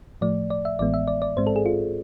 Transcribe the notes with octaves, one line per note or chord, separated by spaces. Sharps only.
A2 F3 A3 D5
D5
E5
A1 A2 E3 G#3 B3 D5
E5
D5
D5
G#2 G#3 C4 C5
A4
G#4
F4